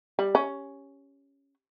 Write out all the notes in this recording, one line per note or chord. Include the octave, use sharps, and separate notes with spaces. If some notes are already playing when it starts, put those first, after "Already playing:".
G3
C#4